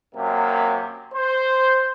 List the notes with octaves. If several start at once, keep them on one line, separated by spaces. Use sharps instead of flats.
F#2 C3 A#3
C5